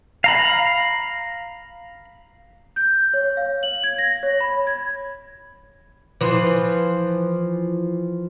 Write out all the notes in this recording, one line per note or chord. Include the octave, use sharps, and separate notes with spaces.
F5 A#5 B5
G6
C#5
F5
F#7
G#6
A#6
C#5
B5
G#6
E3 F3